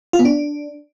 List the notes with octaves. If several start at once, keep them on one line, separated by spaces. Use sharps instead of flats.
F4
B3
D4